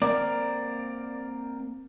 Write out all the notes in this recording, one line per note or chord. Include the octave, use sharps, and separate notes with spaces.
A#3 C4 A#4 D5